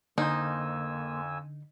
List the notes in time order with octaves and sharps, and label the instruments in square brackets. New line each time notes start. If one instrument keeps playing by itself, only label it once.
[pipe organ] F2 G#5 E6 [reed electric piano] D3 [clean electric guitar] A#3 C5 [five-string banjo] D#4